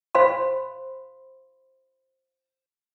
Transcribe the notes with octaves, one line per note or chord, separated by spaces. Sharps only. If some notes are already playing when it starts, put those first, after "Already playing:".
C5 F5 B5 C6